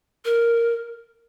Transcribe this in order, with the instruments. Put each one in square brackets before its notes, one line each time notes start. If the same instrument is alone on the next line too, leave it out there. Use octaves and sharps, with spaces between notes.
[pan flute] A#4